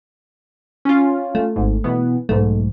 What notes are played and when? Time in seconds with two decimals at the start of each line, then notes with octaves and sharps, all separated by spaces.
0.85 C#4 F4
1.35 A3
1.56 G#1 G#2
1.84 B2 E3 B3
2.29 B1 G#2 A3